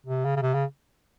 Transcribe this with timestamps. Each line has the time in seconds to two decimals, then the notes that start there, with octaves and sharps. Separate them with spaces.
0.06 C3
0.25 C#3
0.36 C#3
0.42 C3
0.54 C#3